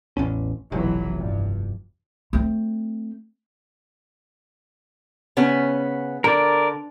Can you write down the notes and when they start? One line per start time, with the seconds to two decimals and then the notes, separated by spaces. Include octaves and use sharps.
0.17 A1 E2 C#4
0.72 F1 B1 E3 F#3
1.17 G2
2.33 A3 C4
5.37 C#3 B3 C#4
6.24 D3 A#4 D5